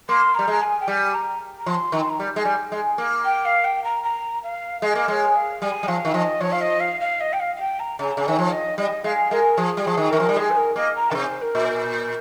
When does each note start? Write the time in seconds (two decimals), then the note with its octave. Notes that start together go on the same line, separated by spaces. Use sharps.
0.08 A#3 C6
0.34 G3 A#5
0.48 G#3 A#5
0.62 G#5
0.80 G5
0.88 G3 G#5
1.14 A#5
1.59 A#5
1.66 F3 C6
1.92 D#3 A#5
2.00 C6
2.09 A#5
2.20 G3
2.36 G#3
2.45 G3
2.72 G#3
2.98 A#3
3.24 G5
3.45 F5
3.64 G5
3.84 A#5
4.03 A#5
4.43 F5
4.82 G#3 D#5
4.95 A#3
5.08 G#3 C#5
5.35 F5
5.61 G3 G#5
5.83 G3
5.88 F3 F5
6.05 D#3
6.14 F3 D#5
6.40 F3 C#5
6.52 F5
6.60 D#5
6.80 F5
7.00 F5
7.20 D#5
7.32 G5
7.40 F5
7.56 F5
7.60 G5
7.79 A#5
7.99 C#3 A#5
8.17 C#3
8.25 D#3 C#5
8.39 F3
8.51 D#5
8.78 G3 D#5
9.04 G#3 F5
9.31 G#3 A#4
9.57 F3 G#4
9.77 G3
9.84 F3 G#4
9.97 D#3
10.10 D#3 A#4
10.20 F3
10.29 G3
10.36 G#3 G#4
10.50 C5
10.56 A#4
10.76 A#3 D#5
10.95 A#5
11.11 C#3 A#4
11.15 C3 C5
11.41 A#4
11.55 A#2
11.64 C5
11.69 A#4